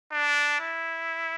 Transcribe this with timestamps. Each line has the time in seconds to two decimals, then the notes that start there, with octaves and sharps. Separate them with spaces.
0.12 D4
0.61 E4